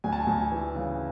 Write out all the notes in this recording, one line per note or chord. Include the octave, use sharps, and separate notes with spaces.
D2 G#5
A5
D2 G#5
E3
C#3